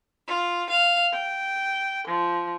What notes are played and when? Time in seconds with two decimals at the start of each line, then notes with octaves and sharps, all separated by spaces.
0.25 F4
0.68 F5
1.13 G5
2.07 F3